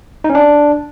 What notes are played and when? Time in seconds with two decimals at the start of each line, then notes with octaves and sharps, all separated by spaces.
0.24 D#4
0.30 C#4
0.35 D4